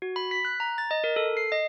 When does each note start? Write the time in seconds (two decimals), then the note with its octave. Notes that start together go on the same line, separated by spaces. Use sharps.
0.02 F#4
0.16 B5
0.31 B6
0.45 F#6
0.60 A#5
0.78 A6
0.91 D#5
1.04 A#4
1.16 A4
1.37 C7
1.52 D#5